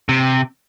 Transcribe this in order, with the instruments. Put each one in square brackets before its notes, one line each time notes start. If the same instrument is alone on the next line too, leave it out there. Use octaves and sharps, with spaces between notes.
[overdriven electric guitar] C3